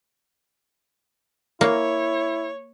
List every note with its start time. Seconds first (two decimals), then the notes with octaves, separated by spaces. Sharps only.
1.61 A#3 E4 C#5